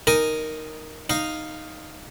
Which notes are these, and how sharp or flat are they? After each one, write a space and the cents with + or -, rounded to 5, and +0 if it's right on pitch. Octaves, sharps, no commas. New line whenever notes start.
D#4 +0 A#4 +0 G#5 +0
D#4 +0 F5 +0